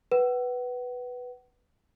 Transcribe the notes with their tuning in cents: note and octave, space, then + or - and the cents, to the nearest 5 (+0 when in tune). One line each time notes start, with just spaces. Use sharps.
B4 +0 F#5 +35